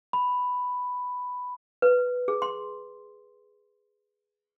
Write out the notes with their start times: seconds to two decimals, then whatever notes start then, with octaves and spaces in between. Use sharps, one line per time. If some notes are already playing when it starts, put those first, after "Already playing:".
0.13 B5
1.82 B4
2.28 G#4
2.42 C6